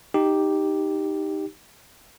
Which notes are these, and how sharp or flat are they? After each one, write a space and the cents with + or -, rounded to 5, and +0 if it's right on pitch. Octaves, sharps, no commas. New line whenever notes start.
D#4 +0 G4 +0